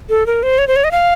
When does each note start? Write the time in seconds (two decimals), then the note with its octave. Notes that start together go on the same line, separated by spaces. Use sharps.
0.10 A4
0.26 A#4
0.43 C5
0.58 C#5
0.68 C5
0.76 C#5
0.84 D#5
0.91 F5